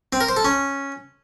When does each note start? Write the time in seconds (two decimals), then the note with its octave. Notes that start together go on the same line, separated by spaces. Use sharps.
0.13 C4
0.21 A#4
0.29 C5
0.37 A4
0.45 C#4